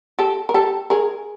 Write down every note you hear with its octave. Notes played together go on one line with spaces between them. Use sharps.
G4 A4
A#4
G4 A4
G#4 A#4